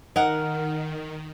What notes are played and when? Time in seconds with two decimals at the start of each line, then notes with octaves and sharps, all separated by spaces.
0.16 D#3 D#4 A#4 F#5